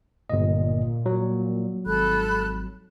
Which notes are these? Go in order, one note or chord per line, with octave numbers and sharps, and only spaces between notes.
G1 A#2 D#5
F#3
G#1 A4 B5 F#6